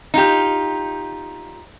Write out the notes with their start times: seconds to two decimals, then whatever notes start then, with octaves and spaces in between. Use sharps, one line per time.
0.14 D#4 F4 G4